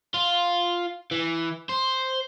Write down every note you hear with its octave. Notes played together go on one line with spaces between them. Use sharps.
F4
E3
C5